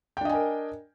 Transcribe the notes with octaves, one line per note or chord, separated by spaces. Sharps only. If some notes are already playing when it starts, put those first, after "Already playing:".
D4 A#4 D#5 G5 G#5